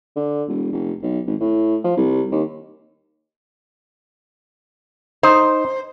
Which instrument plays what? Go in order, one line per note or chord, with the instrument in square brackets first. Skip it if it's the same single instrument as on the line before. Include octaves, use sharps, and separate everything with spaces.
[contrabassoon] D3
E1
F1
B1
G#1
A2
F3
C2
D#2
[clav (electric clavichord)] D#4 [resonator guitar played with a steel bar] C5